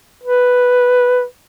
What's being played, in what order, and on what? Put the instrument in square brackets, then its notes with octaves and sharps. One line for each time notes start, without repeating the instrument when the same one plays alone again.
[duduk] B4